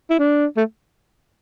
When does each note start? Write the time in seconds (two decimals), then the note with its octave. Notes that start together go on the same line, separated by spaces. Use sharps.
0.10 E4
0.19 D4
0.57 A3